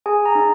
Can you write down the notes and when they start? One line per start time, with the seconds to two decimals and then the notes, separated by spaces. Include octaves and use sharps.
0.06 G#4 G#5
0.26 A#5
0.35 D#4